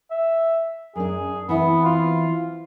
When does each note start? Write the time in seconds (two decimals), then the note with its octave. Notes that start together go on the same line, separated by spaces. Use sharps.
0.11 E5
0.96 F#2 D4 G#4
1.49 E3 B3 C4 E4
1.85 F4